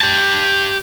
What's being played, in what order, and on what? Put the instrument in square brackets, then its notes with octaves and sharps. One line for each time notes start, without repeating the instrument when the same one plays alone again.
[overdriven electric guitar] G4 A5